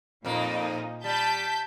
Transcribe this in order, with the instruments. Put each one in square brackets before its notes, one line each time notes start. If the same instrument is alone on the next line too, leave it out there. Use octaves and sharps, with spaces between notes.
[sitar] F2 A#3 [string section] A#2 D#4
[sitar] G3 [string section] A5 G6 B6